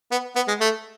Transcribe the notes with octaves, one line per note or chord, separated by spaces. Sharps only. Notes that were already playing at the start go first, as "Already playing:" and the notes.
B3
B3
G#3
A3